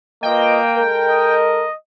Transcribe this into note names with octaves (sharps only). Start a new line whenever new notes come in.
A#3 F4 B4 D#5 G5
G#3 A4 A#4
D#5